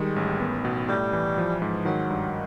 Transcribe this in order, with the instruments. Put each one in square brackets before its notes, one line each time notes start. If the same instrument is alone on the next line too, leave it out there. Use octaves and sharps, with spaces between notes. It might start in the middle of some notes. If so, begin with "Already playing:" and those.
Already playing: [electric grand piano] D#3 G3 [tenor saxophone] G#3
[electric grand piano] A1
B3
B2
[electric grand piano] A2 [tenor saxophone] G3
[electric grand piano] E3
F3
G#2
[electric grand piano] D#3 [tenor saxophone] F#3
[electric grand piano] G2